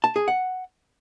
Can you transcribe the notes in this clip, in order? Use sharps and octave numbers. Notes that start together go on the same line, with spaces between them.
A5
G#4
F#5